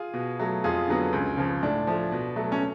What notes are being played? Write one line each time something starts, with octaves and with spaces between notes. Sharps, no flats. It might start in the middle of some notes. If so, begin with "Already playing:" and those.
Already playing: F4 G#4
B2
F#3 A3
F2 F4 G#4
D3 F#3 B3
C#2
C#3 F3
A2 D4
F3 A3
B2
F#3 A3
C#4